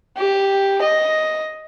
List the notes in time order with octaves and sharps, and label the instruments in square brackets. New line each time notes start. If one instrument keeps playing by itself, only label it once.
[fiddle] G4
D#5